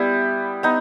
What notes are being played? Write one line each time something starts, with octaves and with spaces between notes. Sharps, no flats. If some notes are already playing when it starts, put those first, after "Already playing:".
Already playing: G3 B3 E4 G4
B3 D#4